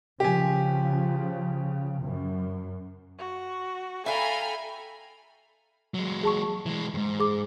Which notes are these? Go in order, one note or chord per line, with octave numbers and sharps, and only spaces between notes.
C#3 F3 G4 G#5
F#2
F#4
A4 E5 F5 G5 G#5 A#5 B5
F#3 G#3
G#4 A5 C#6
E3 G#3
E2 G#2
G#4 D6